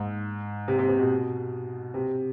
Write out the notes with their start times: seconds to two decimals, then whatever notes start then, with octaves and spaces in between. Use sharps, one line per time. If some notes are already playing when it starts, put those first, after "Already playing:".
Already playing: G#2
0.68 C3
0.79 C3
0.89 C3
1.00 B2
1.94 C3